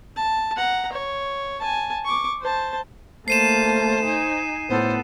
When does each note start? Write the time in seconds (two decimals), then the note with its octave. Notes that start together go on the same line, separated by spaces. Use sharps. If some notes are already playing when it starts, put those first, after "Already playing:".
0.16 A5
0.57 F#5 A#5
0.92 C#5
1.59 G#5 A5
2.05 C#6 D6
2.41 C5 A5
3.28 A3 A#3 C5 A5 C7 D#7 E7
4.04 D#4 G#5
4.69 A2 B3 A4 C5